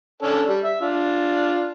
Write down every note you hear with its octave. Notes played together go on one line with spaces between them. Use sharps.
C#4 D4 A4
G3
E5
D4 F4